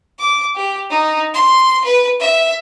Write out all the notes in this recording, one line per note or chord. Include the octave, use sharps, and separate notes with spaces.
D6
G4
D#4
C6
B4
E5